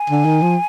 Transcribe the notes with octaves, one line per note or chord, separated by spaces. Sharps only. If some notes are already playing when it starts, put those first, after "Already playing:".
Already playing: G#5
D3
D#3
F3